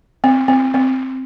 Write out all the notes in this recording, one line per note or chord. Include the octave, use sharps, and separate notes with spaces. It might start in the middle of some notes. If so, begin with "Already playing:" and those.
C4
C4
C4